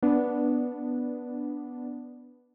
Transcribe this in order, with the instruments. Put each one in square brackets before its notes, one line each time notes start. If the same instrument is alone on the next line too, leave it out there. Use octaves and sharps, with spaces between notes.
[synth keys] B3 D4